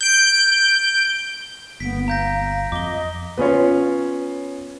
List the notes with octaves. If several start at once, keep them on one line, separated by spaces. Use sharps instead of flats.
G6 D7
G1 A#3 B3 B6 D7
F5 A#5 G6 A#6
F2 D#5 D6 G7
B3 C#4 F4 C#5